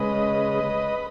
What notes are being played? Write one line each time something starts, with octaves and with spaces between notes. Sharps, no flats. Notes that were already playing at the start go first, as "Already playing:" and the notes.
Already playing: C#3 G#3 B4 D#5